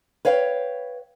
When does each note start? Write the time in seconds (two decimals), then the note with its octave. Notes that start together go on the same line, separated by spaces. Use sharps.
0.25 B4 C#5 F5 G5